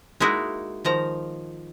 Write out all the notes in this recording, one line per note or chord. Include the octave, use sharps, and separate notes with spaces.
G#3 A#3 D#4 E4 F#4
D#3 F3 A#5